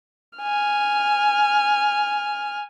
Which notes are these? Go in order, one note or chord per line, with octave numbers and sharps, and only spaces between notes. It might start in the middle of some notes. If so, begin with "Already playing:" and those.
G#5 F6